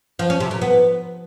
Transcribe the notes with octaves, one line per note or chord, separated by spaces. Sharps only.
F3
C#4
C3
A#2
B3